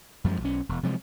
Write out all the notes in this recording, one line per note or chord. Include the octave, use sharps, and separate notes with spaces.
F#2 F3 G3 G#3
B1 C#4
E1
C3 F3 F#3 G#3